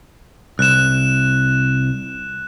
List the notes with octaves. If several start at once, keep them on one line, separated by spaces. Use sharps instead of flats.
C2 F#6 E7